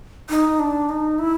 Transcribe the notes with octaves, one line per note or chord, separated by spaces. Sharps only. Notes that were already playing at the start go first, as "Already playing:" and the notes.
D#4
D4
D#4
E4